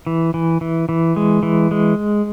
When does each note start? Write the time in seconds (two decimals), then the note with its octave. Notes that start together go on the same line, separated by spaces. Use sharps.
0.07 E3
0.34 E3
0.61 E3
0.89 E3
1.16 G#3
1.43 E3
1.71 G#3